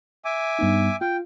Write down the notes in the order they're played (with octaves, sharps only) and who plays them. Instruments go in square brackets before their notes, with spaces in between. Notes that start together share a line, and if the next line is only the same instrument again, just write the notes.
[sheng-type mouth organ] E5 G#5 D6
[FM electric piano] G2 B3 D#4
[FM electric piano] F4 F5 [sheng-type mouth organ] G5